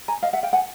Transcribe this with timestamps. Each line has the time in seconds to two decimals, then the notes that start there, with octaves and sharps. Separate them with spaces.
0.08 G#5 A#5
0.22 D#5 F5
0.33 E5 F#5
0.43 F5 G5
0.53 F#5 G#5